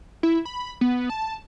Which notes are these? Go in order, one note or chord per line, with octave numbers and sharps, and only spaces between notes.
E4
B5
B3
A5